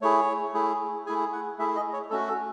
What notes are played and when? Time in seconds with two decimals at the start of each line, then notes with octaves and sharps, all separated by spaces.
0.01 A3 E4 G#4 C#5
0.54 A3 E4 G#4
1.06 A3 E4 G#4 G#5
1.33 F#5
1.59 A3 E4 G#4 E5
1.76 D#5
1.93 C#5
2.10 A3 C#4 F#4 A4
2.28 A4